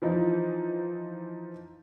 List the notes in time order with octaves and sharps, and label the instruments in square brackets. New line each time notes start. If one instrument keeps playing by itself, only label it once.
[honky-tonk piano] E3 F3 D#4